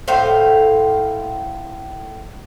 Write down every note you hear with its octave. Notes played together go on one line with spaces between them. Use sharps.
A2 C5 F5